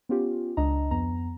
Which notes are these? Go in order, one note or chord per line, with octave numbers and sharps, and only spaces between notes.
B3 C#4 F4 G4
C#2 D4 D#5 A#5
F2 B3 A#5